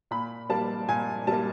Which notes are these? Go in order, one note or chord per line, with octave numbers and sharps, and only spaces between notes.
A#2 B5
G3 A#3 A5
A#2 G#5
G3 A#3 A5